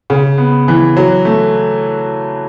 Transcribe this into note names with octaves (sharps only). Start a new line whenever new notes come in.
C#3
B3
E3
F#3
A3